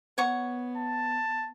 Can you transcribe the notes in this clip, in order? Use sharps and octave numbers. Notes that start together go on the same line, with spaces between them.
B3 C#5 F#5 C#6
A5